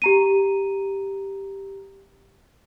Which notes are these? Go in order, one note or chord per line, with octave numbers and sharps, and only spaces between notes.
G4 A#5 D#7